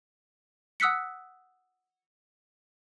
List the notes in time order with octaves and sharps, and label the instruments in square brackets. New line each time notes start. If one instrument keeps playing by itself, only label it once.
[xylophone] F#5 D#6 E6 F#6 B6 C#7